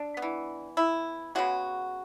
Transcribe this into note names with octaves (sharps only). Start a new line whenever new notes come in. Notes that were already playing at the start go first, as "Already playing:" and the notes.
Already playing: D4
B3
E3
E4
C#3 G#3 B3 F#4